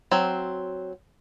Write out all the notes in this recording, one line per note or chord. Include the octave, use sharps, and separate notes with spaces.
F#3 C4